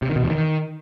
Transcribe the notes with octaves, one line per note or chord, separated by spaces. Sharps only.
C3
D#3
B2
E2
D#3